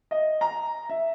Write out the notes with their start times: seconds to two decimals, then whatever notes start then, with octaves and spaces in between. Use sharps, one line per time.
0.11 D#5
0.41 A#5
0.89 E5